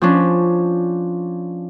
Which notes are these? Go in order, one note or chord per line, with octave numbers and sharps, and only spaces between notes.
F3 C#4 D4